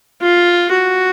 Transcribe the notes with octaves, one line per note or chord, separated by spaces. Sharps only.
F4
F#4